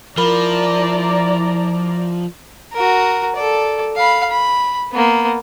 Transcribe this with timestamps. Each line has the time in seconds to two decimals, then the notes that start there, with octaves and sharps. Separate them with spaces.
0.17 F3 E4 A#4 D5 A#5 B5
2.73 F#4 A#4
3.35 A4 D5
3.96 F5 B5
4.30 B5
4.93 A#3 B3